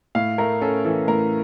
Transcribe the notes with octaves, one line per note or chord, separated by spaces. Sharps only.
A2 F5
A3 A#4
C#4 A4
E3 A4
A2 A#4